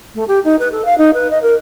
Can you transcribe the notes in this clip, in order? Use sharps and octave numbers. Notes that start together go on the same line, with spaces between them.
A3
G4
D#4
B4
A4
F5
D#4
B4
D#5
A#4